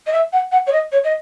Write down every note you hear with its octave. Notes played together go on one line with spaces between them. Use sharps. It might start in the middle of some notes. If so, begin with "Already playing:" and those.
D#5
E5
F#5
F#5
C#5
D#5
C#5
D#5